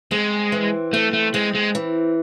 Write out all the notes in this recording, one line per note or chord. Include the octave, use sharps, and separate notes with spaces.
G#3 C4
E3
A3 C4
A3
G#3 C4
G#3
E3